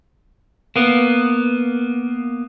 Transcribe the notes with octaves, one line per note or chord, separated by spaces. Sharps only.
A#3 B3